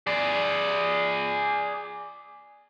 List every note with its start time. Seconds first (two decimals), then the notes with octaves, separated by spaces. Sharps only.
0.07 G#4 D5